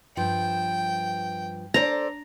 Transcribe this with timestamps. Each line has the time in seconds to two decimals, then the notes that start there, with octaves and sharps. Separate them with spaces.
0.17 G2 F3 G5
1.74 D4 A4 C5 D5 A#5